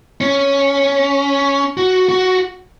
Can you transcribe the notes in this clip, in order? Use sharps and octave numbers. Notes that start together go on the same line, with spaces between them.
C#4
F#4
F#4